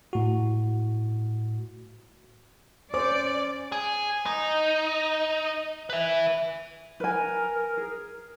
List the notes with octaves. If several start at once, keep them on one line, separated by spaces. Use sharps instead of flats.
A2 F#4
C#4 C5 D5 D6
G#4
D#4
B4 E5
A#4 B4 G#5
G#4